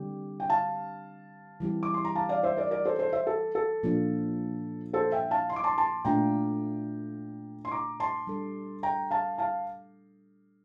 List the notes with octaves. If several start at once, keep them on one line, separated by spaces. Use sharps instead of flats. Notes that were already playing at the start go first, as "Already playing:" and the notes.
Already playing: D3 G3 C4 G4
G5
F5 A5
E3 G3 C4 E4 G4
D6
C6
A#5
F5 A5
D5 F5
C5 E5
A#4 D5
A#4 D5
A4 C5
A4 C5
C5 E5
A4
A4
A#2 F3 A#3 D4 F4
A4 C5
E5 G5
F5 A5
C6
D6
A5 C6
A5 C6
A#2 A3 D4 F4 G5 A#5
C6
A#5 D6
A5 C6
G3 D4 A4
G5 A#5
F5 A5
F5 A5